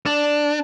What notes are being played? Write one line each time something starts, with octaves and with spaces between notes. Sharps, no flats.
D4